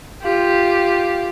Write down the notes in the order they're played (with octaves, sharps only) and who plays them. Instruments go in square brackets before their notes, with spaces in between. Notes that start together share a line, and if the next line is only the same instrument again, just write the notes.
[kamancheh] F4 G4